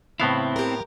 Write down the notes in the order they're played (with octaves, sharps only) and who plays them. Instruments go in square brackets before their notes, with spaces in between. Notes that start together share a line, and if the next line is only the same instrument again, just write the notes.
[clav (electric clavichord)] A2 B3 F5 [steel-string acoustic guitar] C#3 [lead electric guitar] C4 E4
[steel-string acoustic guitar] G4 A#4